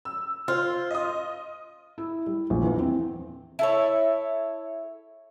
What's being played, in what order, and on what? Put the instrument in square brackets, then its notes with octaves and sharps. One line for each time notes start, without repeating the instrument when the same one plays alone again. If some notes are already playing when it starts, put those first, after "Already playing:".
[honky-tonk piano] E6
[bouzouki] F4 [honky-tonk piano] C5
[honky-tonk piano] D#5 D#6
[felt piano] E4
G3
A#1
E2
C4
[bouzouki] E4 A4 C#5